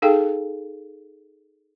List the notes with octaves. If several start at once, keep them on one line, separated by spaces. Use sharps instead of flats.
D#4 G#4 A4 F5 G5